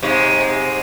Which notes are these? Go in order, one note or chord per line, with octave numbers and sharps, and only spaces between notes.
G#2 C3 G#3